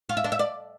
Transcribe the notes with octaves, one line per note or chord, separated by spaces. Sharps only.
F4
E5
D4
E5
D5